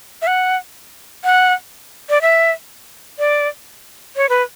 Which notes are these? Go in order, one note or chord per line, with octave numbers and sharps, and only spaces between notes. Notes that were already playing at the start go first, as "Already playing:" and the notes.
E5
F#5
F#5
D5
E5
D5
C#5
B4